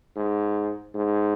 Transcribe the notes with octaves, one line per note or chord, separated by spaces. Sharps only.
G#2
G#2